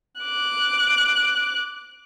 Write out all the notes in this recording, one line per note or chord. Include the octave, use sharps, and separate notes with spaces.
D6 F#6